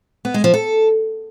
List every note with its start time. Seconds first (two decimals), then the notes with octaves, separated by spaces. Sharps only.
0.25 B3
0.34 G#3
0.44 F3
0.54 A4